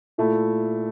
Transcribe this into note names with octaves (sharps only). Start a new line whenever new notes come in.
A#2 A3 E4